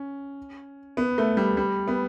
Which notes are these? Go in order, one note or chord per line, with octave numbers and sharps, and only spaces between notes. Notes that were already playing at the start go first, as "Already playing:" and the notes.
Already playing: C#4
B3
A3
G3
G3
B3